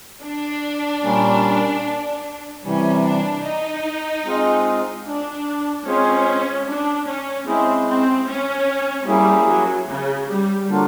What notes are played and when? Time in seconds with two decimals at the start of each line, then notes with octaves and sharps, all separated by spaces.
0.23 D4
1.03 A#2 G3 A#3 C#4
2.64 C3 E3 G3 C#4
3.04 D4
3.44 D#4
4.24 G#3 C4 F4 G#4
5.06 D4
5.85 G#3 C4 C#4 F4 G#4 C5
6.67 D4
7.06 C#4
7.47 G#3 C4 C#4 E4 G#4
7.87 C4
8.27 C#4
9.07 G3 A#3 C#4 E4 G#4
9.47 F#3
9.88 C#3
10.28 G3
10.68 D3 F#3 A#3 D4 F4